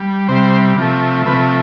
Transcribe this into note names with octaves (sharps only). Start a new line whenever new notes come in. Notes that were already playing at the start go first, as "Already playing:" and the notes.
Already playing: G3
C3 G3 C5
C3 F3 A3
C3 F3 A3 B4